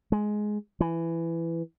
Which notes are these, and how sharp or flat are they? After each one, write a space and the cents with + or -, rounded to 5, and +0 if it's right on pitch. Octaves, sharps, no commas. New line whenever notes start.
G#3 +10
E3 +15